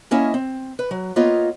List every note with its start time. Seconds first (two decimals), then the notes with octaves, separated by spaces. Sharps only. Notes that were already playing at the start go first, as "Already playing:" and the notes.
0.11 A#3 C#4 E4 C#5 D#5 F5
0.34 C4
0.79 B4
0.91 F#3
1.16 A#3 B3 F4 C#5 D#5 F5